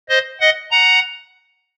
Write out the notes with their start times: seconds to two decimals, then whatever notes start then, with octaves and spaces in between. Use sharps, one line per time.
0.09 C5 D#5
0.40 D#5 F#5
0.71 F#5 A#5